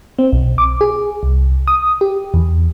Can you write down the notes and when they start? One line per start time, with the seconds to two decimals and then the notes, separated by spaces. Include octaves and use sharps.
0.19 C4
0.32 B1
0.58 D6
0.81 G#4
1.23 C2
1.68 D#6
2.01 G4
2.34 E2